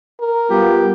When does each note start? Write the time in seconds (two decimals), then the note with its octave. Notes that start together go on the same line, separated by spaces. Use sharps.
0.20 A#4
0.50 G3 B3 F4 G4